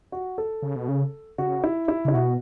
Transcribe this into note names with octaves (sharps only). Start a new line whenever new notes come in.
F#4
A4
C#3
B2
C#3
C#3 F#4
E4
E4
C#3 E4
B2 F#4